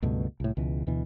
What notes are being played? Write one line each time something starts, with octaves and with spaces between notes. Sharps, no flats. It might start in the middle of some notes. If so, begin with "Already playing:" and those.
C#2 G2 B2 A3
C2 A2
C#2 B2 E3
D2 B2 E3